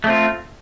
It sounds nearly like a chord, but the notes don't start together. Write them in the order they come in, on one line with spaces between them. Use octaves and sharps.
A3 C4 F4